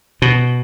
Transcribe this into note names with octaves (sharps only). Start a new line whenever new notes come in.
B2